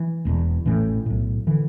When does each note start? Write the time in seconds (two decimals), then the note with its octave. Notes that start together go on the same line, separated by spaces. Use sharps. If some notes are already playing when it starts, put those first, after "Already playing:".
Already playing: E3
0.25 E1 E2 B2
0.66 A1 A2 E3
1.06 B1 A2
1.47 D3 E3